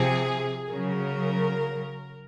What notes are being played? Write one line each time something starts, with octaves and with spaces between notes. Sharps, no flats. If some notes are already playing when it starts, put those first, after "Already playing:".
Already playing: C3 F3 G#4
C#3 F#3 A#4